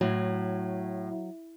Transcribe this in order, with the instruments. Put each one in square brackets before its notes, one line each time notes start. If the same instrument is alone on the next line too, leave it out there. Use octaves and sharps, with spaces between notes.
[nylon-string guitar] A2 [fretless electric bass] F#3